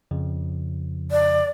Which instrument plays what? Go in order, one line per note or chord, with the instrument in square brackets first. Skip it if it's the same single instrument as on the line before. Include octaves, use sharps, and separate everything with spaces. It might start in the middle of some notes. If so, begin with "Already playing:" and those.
[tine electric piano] F2 C#3 F3
[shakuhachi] D5